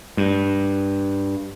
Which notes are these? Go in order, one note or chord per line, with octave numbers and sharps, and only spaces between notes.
G2